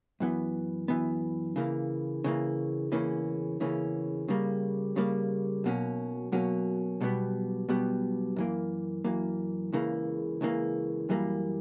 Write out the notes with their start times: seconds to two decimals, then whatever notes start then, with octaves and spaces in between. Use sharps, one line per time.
0.20 F#2 E3 B3
0.88 F#2 E3 B3
1.56 C#3 E3 A#3
2.24 C#3 E3 A#3
2.92 E2 C#3 E3 A#3 C#4
3.60 E2 C#3 E3 A#3 C#4
4.28 C#3 G3 A#3
4.96 C#3 G3 A#3
5.64 B1 B2 F#3 A#3 C#4
6.32 B1 B2 F#3 A#3 C#4
7.01 B1 B2 G3 B3
7.69 B1 B2 G3 B3
8.36 F#2 E3 A#3
9.05 F#2 E3 A#3
9.73 C#2 C#3 E3 A#3
10.41 C#2 C#3 E3 A#3
11.09 F#2 E3 G3 A#3